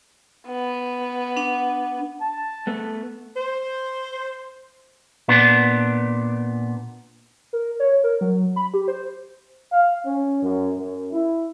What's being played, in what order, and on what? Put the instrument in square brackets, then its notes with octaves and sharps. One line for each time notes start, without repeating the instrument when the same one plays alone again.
[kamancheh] B3
[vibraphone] D4 F#5
[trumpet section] A5
[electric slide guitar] A3 B3
[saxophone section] C5
[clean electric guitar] A#2 B3 D4
[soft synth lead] A#4
C#5
A#4
F#3
B5
G4
C5
[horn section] F5
C#4
F#2
F#2
E4